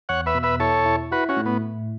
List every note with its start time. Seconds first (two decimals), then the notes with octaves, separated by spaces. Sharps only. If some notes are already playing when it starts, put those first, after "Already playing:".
0.09 E2 C#5 F#5
0.26 B4 E5
0.35 B2
0.43 B4 E5
0.60 E4 A4 C#5
0.86 E4
1.12 E4 F#4 B4
1.29 C#4 F#4
1.37 A2
1.46 B3